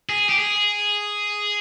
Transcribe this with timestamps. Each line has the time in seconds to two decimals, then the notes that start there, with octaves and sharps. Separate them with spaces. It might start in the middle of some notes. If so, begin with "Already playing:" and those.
0.09 G#4
0.29 G4
0.39 G#4